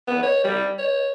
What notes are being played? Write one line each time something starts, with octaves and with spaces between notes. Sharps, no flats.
B3
C#5
G3
C#5